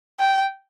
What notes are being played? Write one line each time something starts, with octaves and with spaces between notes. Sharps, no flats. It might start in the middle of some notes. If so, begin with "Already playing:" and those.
G5